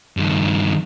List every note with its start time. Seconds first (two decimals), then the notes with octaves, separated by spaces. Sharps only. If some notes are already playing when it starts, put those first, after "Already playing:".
0.17 G2 D#3